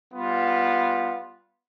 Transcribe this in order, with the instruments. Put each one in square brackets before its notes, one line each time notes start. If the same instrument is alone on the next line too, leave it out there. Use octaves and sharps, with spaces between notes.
[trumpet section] G3 B3 F4